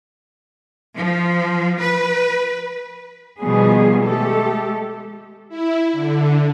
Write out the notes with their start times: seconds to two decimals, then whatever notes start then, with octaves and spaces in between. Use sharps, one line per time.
0.97 F3
1.81 B4
3.39 B2 D#3 F3 G3 B3 G#4
4.02 G#3 A3 G4 A4
5.49 E4
5.92 D3